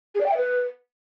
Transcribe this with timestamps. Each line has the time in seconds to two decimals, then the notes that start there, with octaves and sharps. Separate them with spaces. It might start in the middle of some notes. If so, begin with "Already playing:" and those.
0.15 G#4
0.20 D5
0.26 G5
0.31 E5
0.37 B4